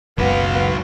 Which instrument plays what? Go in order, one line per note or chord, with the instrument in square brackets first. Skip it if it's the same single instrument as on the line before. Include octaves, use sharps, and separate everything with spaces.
[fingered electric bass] F#1 C#2 [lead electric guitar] F#3 B4 [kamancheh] B3 F5